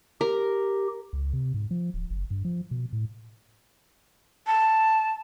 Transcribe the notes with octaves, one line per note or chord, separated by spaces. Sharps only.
G4 A#4
C#2
C3
G#2
F3
D1
F#1
G2
F3
B2
A2
A5